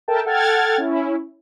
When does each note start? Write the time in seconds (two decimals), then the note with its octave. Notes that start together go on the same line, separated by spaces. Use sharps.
0.08 A4 A#4 E5 G5 A5
0.25 A4 F#5 G5 F6 G#6 A6
0.78 C#4 E4